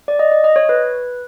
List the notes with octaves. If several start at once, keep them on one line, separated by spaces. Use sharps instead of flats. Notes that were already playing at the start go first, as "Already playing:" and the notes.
D5
D#5
D#5
D#5
C#5
B4